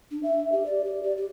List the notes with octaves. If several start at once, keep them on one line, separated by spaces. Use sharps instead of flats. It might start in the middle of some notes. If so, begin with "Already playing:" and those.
D4
E5
G4
D5
G4
D5
G4